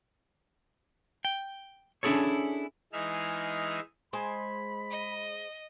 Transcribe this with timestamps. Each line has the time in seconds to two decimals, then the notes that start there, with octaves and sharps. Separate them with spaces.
1.25 G5
2.03 C#4 D4 E4 G#4 A4 C#5
2.93 E3 G#3 D#4 G#4 E5 F6
4.13 G#3 C5 G#5 B5
4.91 D#5